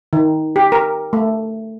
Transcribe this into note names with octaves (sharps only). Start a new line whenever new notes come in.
D#3
G4
A#4
A3